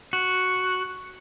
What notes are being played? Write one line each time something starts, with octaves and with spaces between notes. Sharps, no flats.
F#4